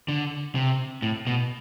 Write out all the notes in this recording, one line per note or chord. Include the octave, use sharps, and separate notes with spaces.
D3
C3
A2
B2